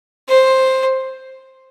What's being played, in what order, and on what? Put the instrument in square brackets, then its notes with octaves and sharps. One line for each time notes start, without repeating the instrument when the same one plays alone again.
[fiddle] C5